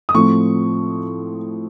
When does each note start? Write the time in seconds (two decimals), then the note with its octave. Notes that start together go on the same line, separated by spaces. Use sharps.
0.09 D#6
0.14 A2 F3 A3 C4 C#6